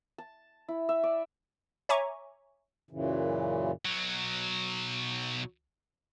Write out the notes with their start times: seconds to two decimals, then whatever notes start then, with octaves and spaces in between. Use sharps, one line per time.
0.18 A5
0.68 E4
0.89 E5
1.04 D5
1.89 C#5 E5 G#5 A#5 C#6 D6
2.91 F#2 A#2 C#3 E3
3.85 B1 F#3